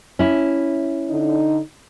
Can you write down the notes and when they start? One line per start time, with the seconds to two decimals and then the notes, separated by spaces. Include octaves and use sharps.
0.19 C#4 E4
1.10 D3 D#4